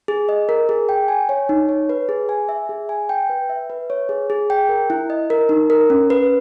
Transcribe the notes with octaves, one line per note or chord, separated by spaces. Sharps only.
G#4
D#5
A#4
G#4
G5
G#5
C#5
D#4
C#5
B4
G#4
G#5
E5
G#4
G#5
G5
B4
E5
B4
C#5
G#4
G#4
G5
A#4
E4
D#5
A#4
D#4
A#4
C#4
B4